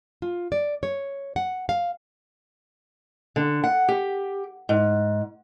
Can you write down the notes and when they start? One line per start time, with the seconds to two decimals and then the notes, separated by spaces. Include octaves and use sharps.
0.22 F4
0.52 D5
0.83 C#5
1.36 F#5
1.69 F5
3.36 D3
3.64 F#5
3.88 G4
4.69 G#2